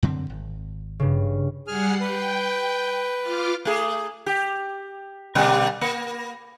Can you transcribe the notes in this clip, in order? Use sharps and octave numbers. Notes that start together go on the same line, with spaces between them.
F#2 D3 C4
G#1
G2 C#3
G3 G#4 F#5 G#5 F6 C7
B4 G5
F4 D6 F6
A3 G#4
G4
B2 G3 A#3
A#3